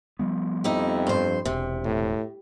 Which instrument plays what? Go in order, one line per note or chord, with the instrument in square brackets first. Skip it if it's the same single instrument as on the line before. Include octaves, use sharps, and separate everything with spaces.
[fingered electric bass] F3 G3 B3
[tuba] F2 [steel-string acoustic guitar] D#4 E4 G4
[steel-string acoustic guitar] G2 C5
[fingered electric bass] E1 [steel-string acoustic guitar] C3
[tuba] A2